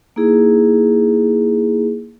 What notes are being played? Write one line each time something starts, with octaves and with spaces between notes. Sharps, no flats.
A#3 D#4 E4 G#4